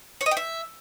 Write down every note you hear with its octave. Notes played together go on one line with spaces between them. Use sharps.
C#5
D#5
G5
E5